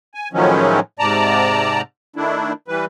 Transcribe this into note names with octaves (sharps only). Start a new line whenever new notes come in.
G#5
A2 D#3 F3 F#3 G#3 C#4
G#2 C3 D5 A5 A#5
D#3 A3 D4 E4
E3 G3 B4